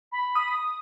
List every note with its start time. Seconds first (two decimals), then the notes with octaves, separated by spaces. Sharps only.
0.12 B5
0.35 D#6